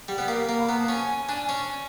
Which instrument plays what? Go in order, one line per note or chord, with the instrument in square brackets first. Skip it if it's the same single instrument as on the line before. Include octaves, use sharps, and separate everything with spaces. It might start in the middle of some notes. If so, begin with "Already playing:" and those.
[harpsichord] G3 [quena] F#5
[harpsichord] B3
[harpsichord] A#3 [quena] G5
[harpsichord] A#3 [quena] A#5
[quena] B5
[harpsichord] B3 [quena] A#5
[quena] A5
[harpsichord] C#4 [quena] G#5
[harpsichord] D4
C#4
[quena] G#5